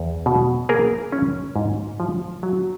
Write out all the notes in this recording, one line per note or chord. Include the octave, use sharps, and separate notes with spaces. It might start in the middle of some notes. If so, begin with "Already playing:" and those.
Already playing: E2
B2
A#3 G#4 A#4
C#4
G#2
F3
F#3